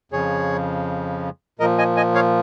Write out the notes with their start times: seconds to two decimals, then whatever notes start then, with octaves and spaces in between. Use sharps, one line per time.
0.12 F2 C#3 F3 G#4 C#5
1.59 A#2 F3 A#4 D#5
1.78 D#5 G#5
1.97 D#5 G#5
2.15 C#5 F5